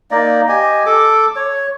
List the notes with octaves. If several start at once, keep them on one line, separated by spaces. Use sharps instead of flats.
A#3 D#4 D5 D#5
G4 D#5 G#5
A4 D6
C#5